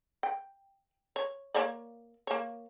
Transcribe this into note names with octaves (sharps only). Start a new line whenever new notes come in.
G5
C#5
A#3 C#5 D5
A#3 C#5